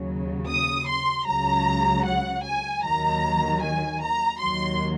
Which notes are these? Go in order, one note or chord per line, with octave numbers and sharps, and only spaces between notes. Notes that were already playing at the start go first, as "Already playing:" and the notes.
Already playing: D#2 C#3 F#3
D#6
C6
C#2 C#3 F#3 A#5
F#5
G#5
D#2 D#3 F#3 A#5
G#5
A#5
D#2 D#3 F#3 C6